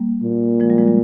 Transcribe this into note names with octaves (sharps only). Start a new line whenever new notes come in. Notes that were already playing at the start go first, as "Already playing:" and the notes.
Already playing: G3 A#3
A#2
F3 G#3
G3
F3 G#3
G3